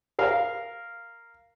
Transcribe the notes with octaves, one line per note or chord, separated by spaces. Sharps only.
A#4 F5